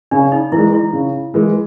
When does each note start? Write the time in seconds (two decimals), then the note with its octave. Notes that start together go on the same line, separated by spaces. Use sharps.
0.11 C#3 D4
0.32 D#4
0.52 E3 G#3 E4
0.73 E4
0.93 C#3
1.34 E3 G#3